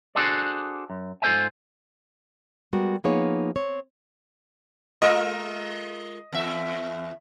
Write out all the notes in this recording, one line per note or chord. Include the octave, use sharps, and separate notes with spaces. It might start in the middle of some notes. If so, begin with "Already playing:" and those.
D4 F#4 G#4 A4 C5 D5
F#2
G#2 F4 A4 C5 E5 G#5
G3 G#3 B3 F#4 A#4
F3 A#3 B3 D#4 G#4 C#5
C4 C#5
G#3 F4 A#4 D#5
E2 E5